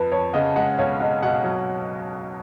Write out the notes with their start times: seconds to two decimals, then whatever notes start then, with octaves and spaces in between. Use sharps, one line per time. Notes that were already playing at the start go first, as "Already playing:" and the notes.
Already playing: F2 F3 B4
0.12 F2 C#5
0.33 C#3 D#5 F#5
0.56 G#3 D#5 F#5
0.78 B1 C#5 F5
1.00 B1 D#5 F#5
1.22 B2 D#5 F#5
1.44 F#3